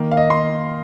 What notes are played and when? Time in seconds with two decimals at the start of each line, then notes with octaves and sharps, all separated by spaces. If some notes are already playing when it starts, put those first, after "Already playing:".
Already playing: D#3 A#3
0.11 F5
0.17 D#5
0.30 C6